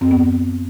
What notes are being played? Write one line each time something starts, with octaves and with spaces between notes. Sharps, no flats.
F#2 C4
B3